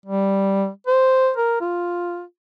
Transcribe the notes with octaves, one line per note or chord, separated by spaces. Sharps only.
G3
C5
A#4
F4